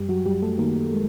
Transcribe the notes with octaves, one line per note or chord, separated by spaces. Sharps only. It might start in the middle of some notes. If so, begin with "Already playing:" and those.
Already playing: F#2 G3 G4
F#3 F#4
F#2 G3 G4
A3 A4
D#3 A#3 A#4
G#3